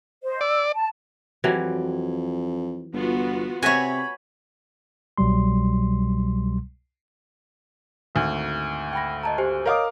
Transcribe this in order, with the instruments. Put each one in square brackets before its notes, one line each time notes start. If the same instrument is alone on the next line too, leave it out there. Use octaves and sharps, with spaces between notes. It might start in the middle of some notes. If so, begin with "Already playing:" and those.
[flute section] C5 D#5
[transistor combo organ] D5 [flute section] E6
[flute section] A5
[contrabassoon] F2 [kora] E3 F#3 G3
[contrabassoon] G1 [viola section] B3 F4 F#4
[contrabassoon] C3 [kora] F#4 B4 E5 [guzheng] C#5 G#5 [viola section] B5
[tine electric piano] C2 B2 F#3 G3 C6
[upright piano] G#1 D2
[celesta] G5 B5 A#6
D#5 A5 A#5
G4 C5 G#5
[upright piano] A#4 F5 D6 [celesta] C#5 D#5 D#6